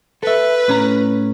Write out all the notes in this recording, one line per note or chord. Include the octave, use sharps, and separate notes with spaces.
A4 B4 E5
A2 C#4 A#5